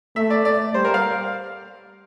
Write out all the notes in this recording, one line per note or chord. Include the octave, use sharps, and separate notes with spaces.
A3 E5
D5
D5
G3 C5
A#4
F5